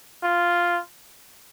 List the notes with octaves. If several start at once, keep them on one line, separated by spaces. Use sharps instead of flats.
F4